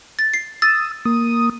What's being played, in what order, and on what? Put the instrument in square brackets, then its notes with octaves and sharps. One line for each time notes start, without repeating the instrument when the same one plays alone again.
[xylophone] A6
C7
[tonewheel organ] D#6 E6 [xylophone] A6
[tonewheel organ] A#3 D#6